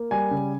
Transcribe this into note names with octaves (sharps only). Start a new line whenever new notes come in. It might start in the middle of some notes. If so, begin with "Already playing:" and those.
Already playing: A#3
G3 G#5
C#3